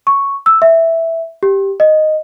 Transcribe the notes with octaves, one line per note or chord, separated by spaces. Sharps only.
C#6
E6
E5
G4
D#5